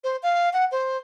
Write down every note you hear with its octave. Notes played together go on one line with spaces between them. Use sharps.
C5
F5
F#5
C5